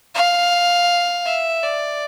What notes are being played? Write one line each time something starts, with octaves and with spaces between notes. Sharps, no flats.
F5
E5
D5